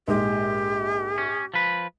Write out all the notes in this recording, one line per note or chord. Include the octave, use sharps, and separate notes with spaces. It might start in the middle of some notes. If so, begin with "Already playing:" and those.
A#1 G#2 G#3 G4
C#4
F3 B4